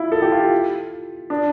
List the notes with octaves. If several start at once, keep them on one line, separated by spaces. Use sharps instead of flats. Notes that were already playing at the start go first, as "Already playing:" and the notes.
Already playing: E4 F4
A4
G4
F4
D4